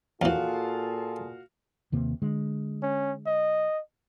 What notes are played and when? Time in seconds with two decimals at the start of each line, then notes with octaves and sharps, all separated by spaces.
0.22 D#2 A#2 E3 F4 F#4 G#4 A4 F5
1.92 D#2 C3 A#3
2.22 D3 G#3
2.83 C#4
3.26 D#5